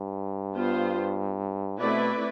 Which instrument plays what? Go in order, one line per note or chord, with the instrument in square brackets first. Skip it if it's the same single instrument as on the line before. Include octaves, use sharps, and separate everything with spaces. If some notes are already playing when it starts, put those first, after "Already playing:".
Already playing: [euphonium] G2
[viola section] B3 F4 C5
[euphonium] B2 [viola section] A3 C4 E4 B4 D5